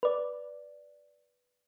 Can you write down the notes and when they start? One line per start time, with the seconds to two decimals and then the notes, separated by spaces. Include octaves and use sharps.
0.03 B4 D5